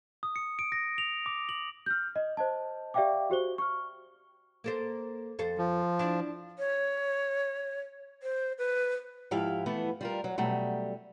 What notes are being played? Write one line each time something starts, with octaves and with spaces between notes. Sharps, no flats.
D#6
C#7
D7
A#6
F7
D6
F#7
F6 G6
D#5
C5 D#5 A5
G4 D5 E5 F5 G5 D6
F#4 G4 C5 G7
C#6 F6
A#3 A4 C5
F2 A4 C5
F3
D4 E4
C#5
C5
B4
G#2 F3 E4 G4 F5
E3 A3 B3
G3 F4 A#4
F#3
B2 F#3 G3 A3